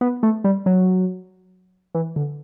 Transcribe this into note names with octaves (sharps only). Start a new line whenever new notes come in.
B3
A3
G3
F#3
E3
D3